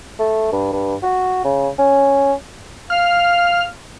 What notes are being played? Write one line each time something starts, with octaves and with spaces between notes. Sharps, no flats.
A3
G2
G2
F#4
C#3
C#4
F5 F6